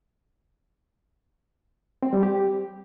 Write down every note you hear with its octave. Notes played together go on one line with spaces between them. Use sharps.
C4
G3
G4